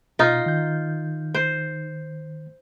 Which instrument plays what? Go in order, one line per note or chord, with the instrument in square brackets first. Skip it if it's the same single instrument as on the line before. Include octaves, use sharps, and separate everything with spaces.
[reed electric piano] B2 [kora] D#4 F4
[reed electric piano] D#3 G6
[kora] C5